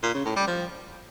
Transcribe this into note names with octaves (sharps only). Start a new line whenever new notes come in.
A#2
C#3
A2
G3
F3